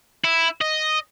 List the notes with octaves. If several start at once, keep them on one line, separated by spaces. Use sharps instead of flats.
E4
D#5